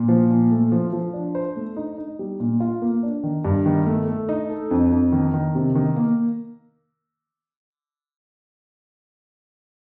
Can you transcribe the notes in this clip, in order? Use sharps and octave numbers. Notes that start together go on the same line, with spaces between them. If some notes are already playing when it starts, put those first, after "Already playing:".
Already playing: A#2
F3
A#2
A3
F3
F3
D4
C5
A3
D#4
D#4
G3
A#2
F4
A#3
D4
D#3
G2
D#3
A3
A3
D#4
A4
F2
F2
D#3
D#3
C3
D#3
A#3